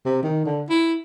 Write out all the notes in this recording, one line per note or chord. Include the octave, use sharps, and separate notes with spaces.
C3
D#3
D3
E4